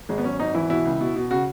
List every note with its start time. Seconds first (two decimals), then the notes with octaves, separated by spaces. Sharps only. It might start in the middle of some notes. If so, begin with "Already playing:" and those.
0.09 G#1 G#3
0.18 B3
0.24 F#2 C#4
0.39 G#1 D#4
0.54 E3 E4
0.69 B2 E4
0.85 C#2
1.00 B2
1.16 B2
1.31 C#3 F#4